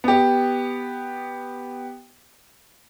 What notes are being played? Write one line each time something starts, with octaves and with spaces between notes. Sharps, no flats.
B3 G4